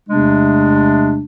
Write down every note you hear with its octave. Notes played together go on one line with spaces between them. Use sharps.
E2 C3 G#3 A3 B3 D4